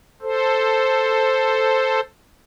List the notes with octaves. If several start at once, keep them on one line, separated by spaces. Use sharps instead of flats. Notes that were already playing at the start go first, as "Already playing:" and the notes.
A4 C5